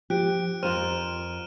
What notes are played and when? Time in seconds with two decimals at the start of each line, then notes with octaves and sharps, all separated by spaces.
0.10 F3 G4 F#6 D7
0.63 F2 F4 A#4 C5 F6 D#7 E7